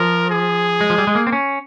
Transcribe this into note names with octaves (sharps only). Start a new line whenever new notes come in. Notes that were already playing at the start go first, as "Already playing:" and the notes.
Already playing: F3 A#4
G#4
G#3
F3
G3
G#3
A#3
C4
C#4